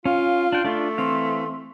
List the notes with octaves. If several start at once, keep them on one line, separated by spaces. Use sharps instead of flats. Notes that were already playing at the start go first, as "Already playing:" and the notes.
C#4 F4 F5
D4 F5 G5
A3 D4 F4 C6
E3 C4 F5 C6